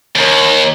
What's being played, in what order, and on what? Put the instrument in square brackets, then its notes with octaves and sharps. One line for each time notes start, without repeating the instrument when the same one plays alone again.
[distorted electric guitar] D#2